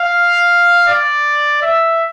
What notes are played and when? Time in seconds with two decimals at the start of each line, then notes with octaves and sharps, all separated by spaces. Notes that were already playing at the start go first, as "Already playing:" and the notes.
Already playing: F5
0.88 D5
1.62 E5